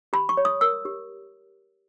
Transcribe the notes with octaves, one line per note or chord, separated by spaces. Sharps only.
G4 B5
C#6
C#5
D#6
A#4 E6
G4